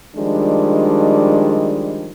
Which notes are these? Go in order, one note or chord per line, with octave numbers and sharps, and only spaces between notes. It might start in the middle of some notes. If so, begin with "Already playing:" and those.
D#3 F3 G3 G#3 D4